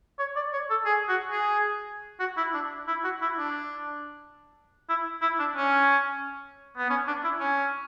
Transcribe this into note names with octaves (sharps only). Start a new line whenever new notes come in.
C#5
D5
C#5
A4
G#4
F#4
G#4
F#4
E4
D4
E4
F#4
E4
D4
E4
E4
D4
C#4
B3
C#4
D4
E4
C#4